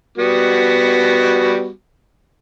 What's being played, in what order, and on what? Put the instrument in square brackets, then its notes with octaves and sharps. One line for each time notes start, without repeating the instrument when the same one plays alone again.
[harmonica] G3 B3 F#4